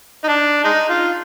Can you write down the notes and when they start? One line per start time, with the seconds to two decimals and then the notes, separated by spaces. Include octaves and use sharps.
0.24 D#4
0.28 D4
0.64 G#3 D#4
0.89 F4